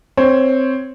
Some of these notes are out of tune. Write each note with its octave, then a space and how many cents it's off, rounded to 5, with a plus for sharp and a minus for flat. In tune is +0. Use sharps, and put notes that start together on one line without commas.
C4 +0 C#5 +0